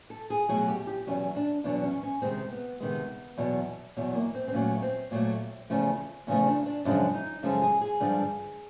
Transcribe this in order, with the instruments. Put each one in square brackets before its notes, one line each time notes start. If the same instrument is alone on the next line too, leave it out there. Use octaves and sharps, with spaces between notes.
[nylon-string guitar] A4
G#4
B2 F#3 A3 G#4
G4
G4
E2 B2 F#3 C#4
D4
E2 B2 F#3 D4
C#4
C#4
C3 D#3 G#3 C4
B3
C3 D#3 G#3 B3
E2 B2 F#3
E2 B2 F#3
A#3
C4
C4
A#2 F#3 A3 C#4
C4
A#2 F#3 A3
E2 C#3 F3 A3
E2 C#3 F3 A3 C#4
D4
D4
F#2 C#3 F3 G#3 D4
D#4
F#2 C#3 F3 G#3 A4
G#4
G#4
G2 D3 F3 G#3